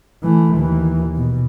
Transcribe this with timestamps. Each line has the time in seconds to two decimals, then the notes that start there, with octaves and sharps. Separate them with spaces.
0.23 E3 A3
0.57 D#2 E3
1.16 B2